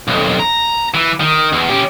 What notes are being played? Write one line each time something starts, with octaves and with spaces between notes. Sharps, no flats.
B1 F2
A#5
E3
D#3
E2
C#4 G4